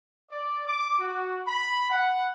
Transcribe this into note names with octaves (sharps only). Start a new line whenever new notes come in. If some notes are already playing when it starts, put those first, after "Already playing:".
D5
D6
F#4
B5
F#5